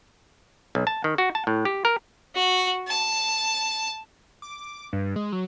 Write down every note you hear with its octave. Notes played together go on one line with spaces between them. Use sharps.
B1
A5
D#3
F#4
A5
A2
G4
A#4
F#4
A5
D6
G2
G#3
F#3